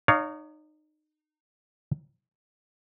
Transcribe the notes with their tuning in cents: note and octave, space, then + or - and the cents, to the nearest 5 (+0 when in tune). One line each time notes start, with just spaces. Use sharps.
D#4 -25 C#5 +25 F5 +0